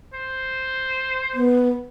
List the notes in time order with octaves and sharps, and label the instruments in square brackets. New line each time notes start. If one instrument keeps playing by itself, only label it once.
[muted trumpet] C5
[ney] B3